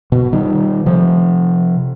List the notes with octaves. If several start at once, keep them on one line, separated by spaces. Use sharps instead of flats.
B2
D#3 G3
C3 F3